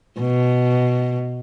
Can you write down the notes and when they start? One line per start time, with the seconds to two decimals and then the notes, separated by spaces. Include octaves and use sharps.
0.20 B2